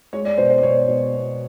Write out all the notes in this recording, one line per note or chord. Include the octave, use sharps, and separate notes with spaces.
G#3 C#5
D5
B2 C5
C5
D5
B2 C#5
B2
B3